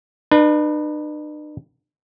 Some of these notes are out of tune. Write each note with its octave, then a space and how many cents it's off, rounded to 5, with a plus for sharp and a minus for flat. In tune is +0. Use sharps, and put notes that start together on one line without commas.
D4 +45 B4 -15